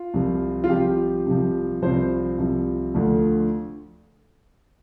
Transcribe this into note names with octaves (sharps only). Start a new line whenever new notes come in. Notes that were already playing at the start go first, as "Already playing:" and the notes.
Already playing: F4
C2 C3 F3
F4
C2 C3 F3 G4
C2 C3 F3
C2 C3 F3 C5
C2 C3 F3
D2 D3 F3